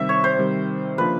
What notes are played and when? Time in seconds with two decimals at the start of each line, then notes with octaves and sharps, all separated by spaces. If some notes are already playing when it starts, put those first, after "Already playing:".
Already playing: C3 D#3 G3 E5
0.09 C#5
0.24 C5
0.39 C3 D#3 G3
0.98 C#3 F3 A#3 D4 F4 B4